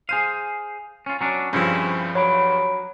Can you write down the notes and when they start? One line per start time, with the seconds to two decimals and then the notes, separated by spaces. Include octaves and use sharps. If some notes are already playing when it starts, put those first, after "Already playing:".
0.09 G#4 C5 F5 D#7
1.06 C#4 F4
1.21 F#3 C#4 D4
1.53 G2 C#3 F3 C4 C#4 E4
2.15 F#3 C#5 B5 D7